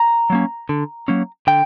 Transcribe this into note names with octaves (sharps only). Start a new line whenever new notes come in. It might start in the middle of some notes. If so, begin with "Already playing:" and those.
Already playing: A#5
F#3 A#3 C#4
D3
F#3 A#3 C#4
D3 G5